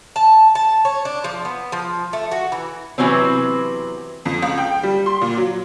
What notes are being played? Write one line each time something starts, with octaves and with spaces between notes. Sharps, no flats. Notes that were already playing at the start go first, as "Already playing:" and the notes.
A5
A5
C#5
D4
F3
B3
F3
A3
F#4
E3
C3 E3 F#3 B3 C4
F2
C#2
G5
G3
C6
A#2
F#3